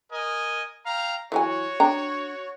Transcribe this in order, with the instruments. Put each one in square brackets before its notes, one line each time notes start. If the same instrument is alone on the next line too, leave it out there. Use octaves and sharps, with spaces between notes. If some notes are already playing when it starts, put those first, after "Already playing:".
[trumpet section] A#4 D#5 G#5
F5 G5 A#5
[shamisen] E3 F#3 G#5 [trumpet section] F#4 C#5
[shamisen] D4 G5 A#5